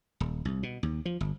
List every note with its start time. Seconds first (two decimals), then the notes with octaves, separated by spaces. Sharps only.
0.20 D#1
0.45 C2
0.63 B2
0.83 D#2
1.06 F3
1.21 G1